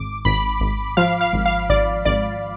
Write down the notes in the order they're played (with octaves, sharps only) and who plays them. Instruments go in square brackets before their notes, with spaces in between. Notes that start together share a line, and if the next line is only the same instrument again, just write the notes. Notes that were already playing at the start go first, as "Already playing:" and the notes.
Already playing: [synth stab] G#1 D6
G#1 B5
G#1
F3 F5
F5
G#1
F5
G#1 D5
G#1 D5